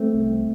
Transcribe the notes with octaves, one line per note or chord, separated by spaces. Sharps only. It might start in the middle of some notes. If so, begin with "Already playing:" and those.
Already playing: A3 C4
C2